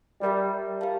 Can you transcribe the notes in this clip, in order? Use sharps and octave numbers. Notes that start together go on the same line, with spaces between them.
G3 G4 A#4 E5 G5
G4 A#4 F5 A5